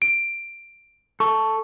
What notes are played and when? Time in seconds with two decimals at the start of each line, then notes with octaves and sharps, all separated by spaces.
0.02 D7
1.20 A4 C#6